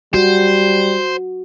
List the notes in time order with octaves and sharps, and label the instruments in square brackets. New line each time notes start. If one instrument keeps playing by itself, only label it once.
[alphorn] G3 [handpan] F#4 [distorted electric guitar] C5